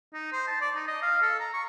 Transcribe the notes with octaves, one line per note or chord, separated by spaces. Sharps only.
D#4
C5
A5
D5
D#4
D#5
F5
A4
A#5
C#6